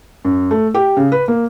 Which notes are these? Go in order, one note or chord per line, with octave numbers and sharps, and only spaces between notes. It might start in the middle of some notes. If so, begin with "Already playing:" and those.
F#2
A3
G4
C#3
B4
A#3